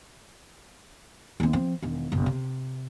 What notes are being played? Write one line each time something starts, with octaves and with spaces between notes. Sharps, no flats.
D#2 C4
F3 C4
E1 D#3
F#1 B1
C3